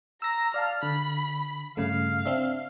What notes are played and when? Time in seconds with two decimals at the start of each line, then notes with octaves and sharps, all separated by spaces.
0.22 A#5 E6 A#6
0.54 D5 F5 A5 F6
0.83 D3 B5
1.77 G2 C#3 A3 F5
2.26 C4 D4 E5